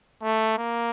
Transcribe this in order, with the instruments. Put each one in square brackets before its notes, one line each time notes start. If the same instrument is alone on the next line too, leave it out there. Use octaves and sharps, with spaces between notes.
[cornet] A3
A#3